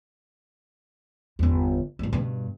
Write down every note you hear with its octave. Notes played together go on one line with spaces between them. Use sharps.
G1 E2
A1 G3
G2 B2